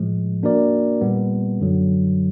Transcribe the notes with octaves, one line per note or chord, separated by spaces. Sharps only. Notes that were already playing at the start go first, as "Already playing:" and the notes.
Already playing: A2 F3 G#3
A#3 D4 F#4 A#4 D5
A#2 G3 B3
F#2 D3 F#3